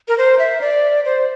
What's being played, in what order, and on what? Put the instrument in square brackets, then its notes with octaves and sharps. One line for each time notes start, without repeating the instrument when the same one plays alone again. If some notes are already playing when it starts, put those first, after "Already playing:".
[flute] A#4
C5
E5
D5
C5